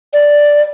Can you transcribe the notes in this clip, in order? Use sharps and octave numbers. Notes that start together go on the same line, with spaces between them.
D5